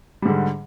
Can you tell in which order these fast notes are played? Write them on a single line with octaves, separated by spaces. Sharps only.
G3 G#2 D3